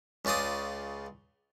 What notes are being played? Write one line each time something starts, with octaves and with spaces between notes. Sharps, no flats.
C#2 C#3 F4 D5 D#6